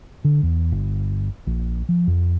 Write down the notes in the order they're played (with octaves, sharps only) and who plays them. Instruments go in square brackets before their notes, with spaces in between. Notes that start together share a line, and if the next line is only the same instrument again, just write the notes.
[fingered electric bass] D3
E2
G1
A#1
F3
F2